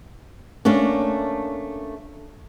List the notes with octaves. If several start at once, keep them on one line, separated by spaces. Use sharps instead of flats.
A3 A#3 C#4 D4